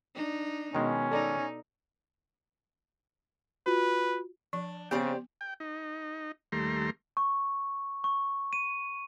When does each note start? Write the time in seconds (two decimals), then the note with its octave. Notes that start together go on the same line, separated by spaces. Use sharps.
0.14 D4 D#4
0.75 B2 D#3 G#3 C#4
1.11 D#4 A4 D5 A#5
3.66 F4 F#4 B4
4.53 F3 D4
4.91 C#3 B3 C4 G4 C5 D5
5.41 G5
5.60 D#4
6.52 D#2 G3 A3 A#5 C6
7.17 C#6
8.04 C#6
8.53 D#7